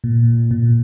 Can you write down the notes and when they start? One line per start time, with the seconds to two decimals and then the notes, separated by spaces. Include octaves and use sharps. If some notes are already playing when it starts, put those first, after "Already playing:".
0.04 A#2
0.51 A#2